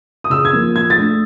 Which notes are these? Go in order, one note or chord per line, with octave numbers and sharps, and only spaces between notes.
D#6
C#3 E6
G#6
F3 A#3
F3 G#6
A6
A3 D4